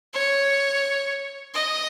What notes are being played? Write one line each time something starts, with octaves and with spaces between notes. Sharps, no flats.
C#5
D#5